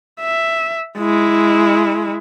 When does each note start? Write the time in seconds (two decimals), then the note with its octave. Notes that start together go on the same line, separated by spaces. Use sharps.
0.20 E5
0.98 G#3 E4